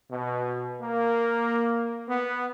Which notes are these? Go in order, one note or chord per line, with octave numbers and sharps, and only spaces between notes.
B2
A#3
B3